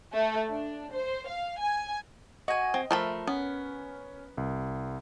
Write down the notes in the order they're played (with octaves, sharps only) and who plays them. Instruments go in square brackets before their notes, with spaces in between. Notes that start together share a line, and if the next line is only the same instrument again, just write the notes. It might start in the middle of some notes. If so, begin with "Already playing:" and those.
[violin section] A3
D4
C5
F5
G#5
[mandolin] F#4 G#5 [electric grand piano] D#5
[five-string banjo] C4
[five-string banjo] F3 A3 B5 [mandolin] A#4 [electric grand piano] E5
[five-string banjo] B3 [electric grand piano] C#4
[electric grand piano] C2